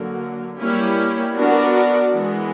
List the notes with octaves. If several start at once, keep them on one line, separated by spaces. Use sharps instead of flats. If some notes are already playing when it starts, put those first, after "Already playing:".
Already playing: D3 F#3 A#3
G3 A#3 C#4 E4 G4
B3 D4 F#4 A#4 D5
E3 G#3 B3